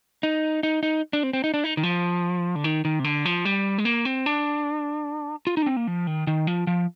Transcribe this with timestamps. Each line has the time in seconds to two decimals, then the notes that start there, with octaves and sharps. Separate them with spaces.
0.23 D#4
0.63 D#4
0.83 D#4
1.13 D4
1.23 C4
1.33 C4
1.44 D#4
1.54 D4
1.64 D#4
1.77 D#3
1.83 F3
2.56 D3
2.64 D#3
2.85 D#3
2.99 C3
3.04 D3
3.25 F3
3.45 G3
3.78 G#3
3.85 A#3
4.05 C4
4.26 D4
5.47 F4
5.57 D#4
5.62 D4
5.66 C4
5.77 A#3
5.87 F3
6.07 D#3
6.27 D#3
6.47 F3
6.67 F3